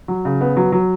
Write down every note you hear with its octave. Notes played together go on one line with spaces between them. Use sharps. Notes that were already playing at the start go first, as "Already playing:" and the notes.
F#3
C#3
B3
F#3
F#3